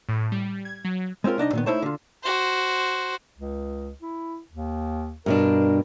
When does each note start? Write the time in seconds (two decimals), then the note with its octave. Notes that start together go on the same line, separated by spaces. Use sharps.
0.09 A2
0.32 G3
0.65 G#6
0.85 F#3
1.24 G#3 C4 C#4 F4 A#4
1.38 C2 D4 D#4 D#5
1.53 A#2 D#3 B3
1.66 A3 D#4 E4 C5 C#5 A5
1.82 D3 F4
2.23 F#4 C5
3.38 C#2
4.02 E4
4.50 D#2
5.26 G2 B2 D4 A#4